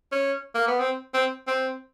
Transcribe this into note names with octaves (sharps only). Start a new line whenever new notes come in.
C#4
A#3
B3
C4
C4
C4